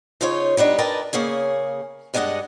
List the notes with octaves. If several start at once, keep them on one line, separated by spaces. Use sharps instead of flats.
C#3 D#4 F4 A4 C5 C#5
G3 B3 D4 D#4
A#4 B4 D5 D#5 G5 A5
C#3 A#3 C#4 G#4
G2 G#3 D4 D#4 D#5 F#5